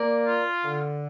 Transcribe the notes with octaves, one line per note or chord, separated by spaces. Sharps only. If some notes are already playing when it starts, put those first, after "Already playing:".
Already playing: A#3 A#4 D5
F4
D3